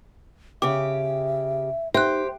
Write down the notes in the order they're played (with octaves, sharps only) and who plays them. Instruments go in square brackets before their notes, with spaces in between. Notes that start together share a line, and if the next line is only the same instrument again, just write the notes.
[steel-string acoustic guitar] C#3 G4 [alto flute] E5 [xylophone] D6
[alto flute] D#4 [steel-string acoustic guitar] G4 [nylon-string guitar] C5 [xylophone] E5 F#6